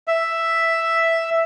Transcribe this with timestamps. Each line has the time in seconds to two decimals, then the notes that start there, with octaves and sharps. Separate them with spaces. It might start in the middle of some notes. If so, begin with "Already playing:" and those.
0.08 E5